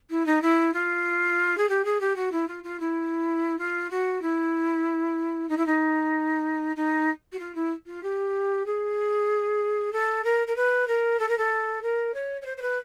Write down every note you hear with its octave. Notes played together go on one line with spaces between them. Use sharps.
E4
D#4
E4
F4
G#4
G4
G#4
G4
F#4
E4
F4
F4
E4
F4
F#4
E4
D#4
E4
D#4
D#4
F#4
F4
E4
F4
G4
G#4
A4
A#4
A#4
B4
A#4
A4
A#4
A4
A#4
C#5
C#5
C5
C5
B4